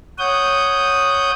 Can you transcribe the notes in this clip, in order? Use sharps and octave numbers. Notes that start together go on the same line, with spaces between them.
C#5 F#5 D#6 G6